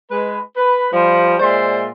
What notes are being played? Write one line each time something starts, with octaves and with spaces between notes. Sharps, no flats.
G#3 B4
B4
F3 G3
A#2 G#3 C5 D5 E5 C6